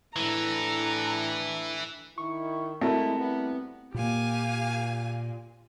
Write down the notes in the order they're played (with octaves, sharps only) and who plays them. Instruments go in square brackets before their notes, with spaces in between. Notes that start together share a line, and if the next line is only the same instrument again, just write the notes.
[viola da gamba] A2 D4 A4 [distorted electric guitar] E3 [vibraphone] E4 [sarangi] A#5
[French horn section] D#3 E4 [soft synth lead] C#6
[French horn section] G#3 E4 [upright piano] A3 F#4 A#4 [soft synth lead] C4
[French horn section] G3 B3 E4
[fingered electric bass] A#2 A#3 [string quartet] G4 F5 G#5